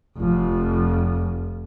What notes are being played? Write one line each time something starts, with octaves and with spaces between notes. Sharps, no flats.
F1 F2